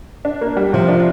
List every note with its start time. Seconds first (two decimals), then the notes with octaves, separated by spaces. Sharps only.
0.25 D4
0.41 A#3
0.57 G3
0.73 C3 F3
0.89 D4